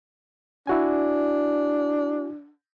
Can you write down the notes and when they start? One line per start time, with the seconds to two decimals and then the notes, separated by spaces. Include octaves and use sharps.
0.67 D4 E4 F#4 G#5